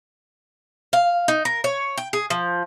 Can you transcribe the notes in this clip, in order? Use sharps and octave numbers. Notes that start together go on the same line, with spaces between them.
F5
D#4
A#4
C#5
G5
G#4
F3